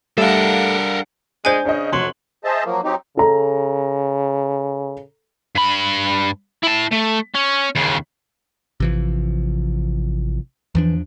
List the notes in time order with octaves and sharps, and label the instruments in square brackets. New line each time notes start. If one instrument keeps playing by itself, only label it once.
[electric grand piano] G3 F5 [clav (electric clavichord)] A3 [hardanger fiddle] D4 F#5 [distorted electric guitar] A4 A#4
[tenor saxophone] G#3 [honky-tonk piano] D4 G6 [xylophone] C5 G#5
[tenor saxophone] C#3 [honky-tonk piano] D4 D#5
[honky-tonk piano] F1 C6 F#7 [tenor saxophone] F#3
[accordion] G#4 C5 D#5 E5 A5
F3 F#3 A#3
F#3 C4 D#4 G4
[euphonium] C#3 [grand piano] A4 A#5
[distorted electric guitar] G2 B5
E4 A5
A3
C#4
D#2 C#3
[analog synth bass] A1 [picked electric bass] C3 E3 F3
[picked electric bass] E2 F3 D4 [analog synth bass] E3